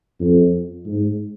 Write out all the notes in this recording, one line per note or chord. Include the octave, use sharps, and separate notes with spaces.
F2
G#2